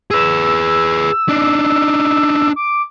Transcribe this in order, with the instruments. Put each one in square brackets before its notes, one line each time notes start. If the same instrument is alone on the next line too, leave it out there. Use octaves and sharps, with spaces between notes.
[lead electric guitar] G#4 B4 [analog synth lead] E6
[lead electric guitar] D4 D#4
[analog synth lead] D6